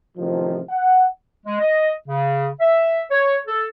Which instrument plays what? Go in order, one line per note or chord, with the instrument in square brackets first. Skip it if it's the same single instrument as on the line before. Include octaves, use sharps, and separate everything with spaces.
[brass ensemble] A1 C3 D#3 F3
F#5
[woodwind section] G#3
D#5
C#3
E5
C#5
A4